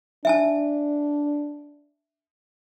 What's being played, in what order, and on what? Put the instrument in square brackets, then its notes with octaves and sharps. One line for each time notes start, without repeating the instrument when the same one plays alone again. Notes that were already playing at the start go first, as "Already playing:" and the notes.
[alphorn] D4 [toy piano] E5 G#5 A5